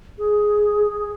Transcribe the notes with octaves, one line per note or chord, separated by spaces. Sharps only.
G#4
G#4